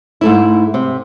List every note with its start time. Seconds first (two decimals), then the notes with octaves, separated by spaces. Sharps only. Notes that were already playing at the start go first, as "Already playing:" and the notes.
0.21 G#2 A3 E4
0.74 C3